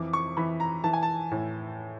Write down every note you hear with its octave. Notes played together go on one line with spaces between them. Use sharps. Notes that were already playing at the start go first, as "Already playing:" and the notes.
Already playing: F2 E3 D6
C#6
E3 B5
A#5
E3 A5
G#5
A5
A2